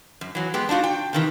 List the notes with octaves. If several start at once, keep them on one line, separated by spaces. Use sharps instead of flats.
F#2
E3 F#3
G#3 B3 G4
D4 D#4 F4 F#4
G5
C3 D#3 E3